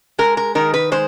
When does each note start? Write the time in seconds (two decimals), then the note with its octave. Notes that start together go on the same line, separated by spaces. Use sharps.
0.19 G#3 A#4
0.37 A#4
0.55 D#3 A#4
0.74 B4
0.92 G#3 C5